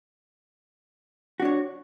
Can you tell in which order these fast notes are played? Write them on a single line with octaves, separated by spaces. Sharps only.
F#4 D4 C#5